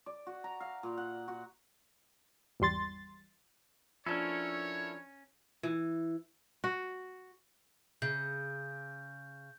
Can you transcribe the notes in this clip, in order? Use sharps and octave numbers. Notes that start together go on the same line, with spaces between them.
D5
F#4
A#5
F5
A#2
F#5
F#4
G#1 E2 G3 C6 A6
F3 C#4 D4 E4 A4 A#4 C#5
E3
F#4
C#3 G6